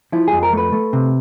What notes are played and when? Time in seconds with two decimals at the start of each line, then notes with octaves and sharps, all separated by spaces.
0.12 F3 E4
0.28 G#4
0.33 F2
0.43 A#4
0.53 A3 B4
0.72 A3
0.93 C3